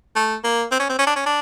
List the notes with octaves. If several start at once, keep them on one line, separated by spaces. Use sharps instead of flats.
A3
A#3
C4
C#4
C4
C#4
D4
C#4
D4